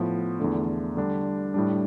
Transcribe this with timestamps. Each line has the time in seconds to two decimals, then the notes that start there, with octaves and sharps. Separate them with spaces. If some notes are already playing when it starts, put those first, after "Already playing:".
Already playing: A2 F3 B3
0.39 E2 D3 A3 D4
0.97 D3 G3 D4
1.54 A2 G3 D4